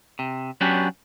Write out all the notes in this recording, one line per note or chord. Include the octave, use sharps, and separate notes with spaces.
C3
F#3 B3 C#4 D4 F#4 G4